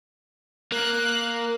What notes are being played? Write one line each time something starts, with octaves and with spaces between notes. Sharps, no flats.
A#3 F#6